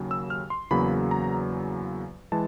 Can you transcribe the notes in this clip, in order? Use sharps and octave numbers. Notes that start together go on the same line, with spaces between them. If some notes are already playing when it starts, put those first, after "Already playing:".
Already playing: D#2 C#3 F#3
E6
F6
C6
E2 C#3 F#3 A#3 B5
A#5
E3 G#3 A5